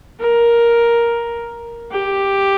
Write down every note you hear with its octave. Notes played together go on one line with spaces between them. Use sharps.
A#4
G4